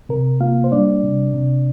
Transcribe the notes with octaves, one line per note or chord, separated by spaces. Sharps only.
C3 A#4
A#3 F4 F5
C5
G3 D4 D5
C3
C3